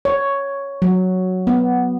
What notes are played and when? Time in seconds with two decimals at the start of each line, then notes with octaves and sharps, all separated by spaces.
0.05 C#5
0.82 F#3
1.47 B3